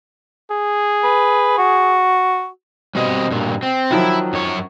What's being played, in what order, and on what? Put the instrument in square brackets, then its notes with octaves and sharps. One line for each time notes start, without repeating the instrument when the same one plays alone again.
[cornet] G#4
[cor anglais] B4
F#4
[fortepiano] B2 [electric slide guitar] G3 C4 D#5
[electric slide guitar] G2 A#2
C4
[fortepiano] D#3 F3 F#3 [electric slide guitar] E4
[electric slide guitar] F#2 C#5